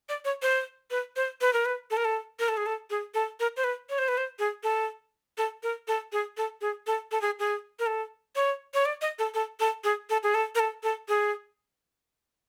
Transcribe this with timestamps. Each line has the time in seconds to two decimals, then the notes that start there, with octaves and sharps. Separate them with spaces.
0.09 D5
0.25 C#5
0.42 C5
0.91 B4
1.16 C5
1.41 B4
1.53 A#4
1.65 B4
1.91 A4
1.97 A#4
2.05 A4
2.39 A#4
2.48 A4
2.57 G#4
2.66 A4
2.90 G#4
3.14 A4
3.40 A#4
3.57 C5
3.64 B4
3.90 C#5
3.98 C5
4.08 B4
4.17 C5
4.39 G#4
4.63 A4
5.38 A4
5.63 A#4
5.88 A4
6.12 G#4
6.37 A4
6.61 G#4
6.87 A4
7.12 A4
7.21 G#4
7.39 G#4
7.79 A#4
7.87 A4
8.36 C#5
8.74 C#5
8.85 D5
9.01 D#5
9.19 A4
9.34 A4
9.60 A4
9.84 G#4
10.10 A4
10.23 G#4
10.34 A4
10.55 A#4
10.59 A4
10.83 A4
11.09 G#4